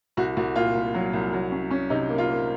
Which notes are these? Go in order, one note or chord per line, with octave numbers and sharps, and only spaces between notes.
C2 F#4
C2 F#4
A#2 F4
C2
F#3
C2
F#3
C#4
C#4
C3 D#4
A#3
F4
A#3